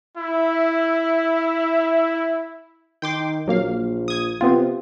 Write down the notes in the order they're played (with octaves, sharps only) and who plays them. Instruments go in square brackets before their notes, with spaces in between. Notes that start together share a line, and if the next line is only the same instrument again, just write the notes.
[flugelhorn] E4 [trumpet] E5
[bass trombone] D#3 [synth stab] G5 C6 D6
[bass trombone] A#1 [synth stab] F#3 A#3 F5
[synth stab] D#6 G#6
[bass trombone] C3 [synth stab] B3 C4 F4